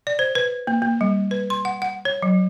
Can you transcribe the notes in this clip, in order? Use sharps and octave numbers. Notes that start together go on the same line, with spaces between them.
D5
C5
B4
A#3
A#3
G3
B4
C6
F#5
F#5
C#5
F#3